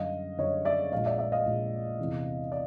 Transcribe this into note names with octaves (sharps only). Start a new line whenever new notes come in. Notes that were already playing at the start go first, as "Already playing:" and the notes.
Already playing: F#2 D3 G3 D#5 F5
F#2 D3 G3 C#5 D#5
D5 E5
A#1 A#2 F3 G#3 D#5 F5
D5 E5
D5 E5
D#5 F5
A#1 A#2 F3 G#3
E2 C3 E3
D5